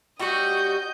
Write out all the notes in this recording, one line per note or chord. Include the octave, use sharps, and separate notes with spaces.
G3 F#4 G4 D#5 G6